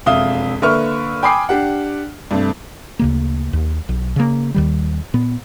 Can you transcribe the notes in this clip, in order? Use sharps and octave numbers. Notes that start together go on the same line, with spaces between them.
E1 F2 E5 F5 D#6 G7
D3 A#3 B4 E5 C#6 F6
G5 G#5 B5 D6 D#6 C7
D4 G4 F#5
G2 C3 A3
D2 C#3 A#3
D#2
B1
C#3 A#3
D#2 D#3 G3
A#2 B3